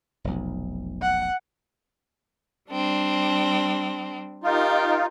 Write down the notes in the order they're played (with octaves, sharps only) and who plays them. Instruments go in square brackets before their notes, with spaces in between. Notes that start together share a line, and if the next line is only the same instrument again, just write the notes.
[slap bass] F1 B1
[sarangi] F#5
[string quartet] G3 C4 D4
[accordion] D#4 F4 [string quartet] G4 A#4